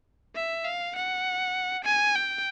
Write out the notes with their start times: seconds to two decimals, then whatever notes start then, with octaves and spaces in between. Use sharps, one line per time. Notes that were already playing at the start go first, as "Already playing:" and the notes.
0.35 E5
0.64 F5
0.95 F#5
1.84 G#5
2.15 G5